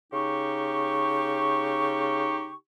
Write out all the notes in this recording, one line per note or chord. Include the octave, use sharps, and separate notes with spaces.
C#3 D#4 G4 C#6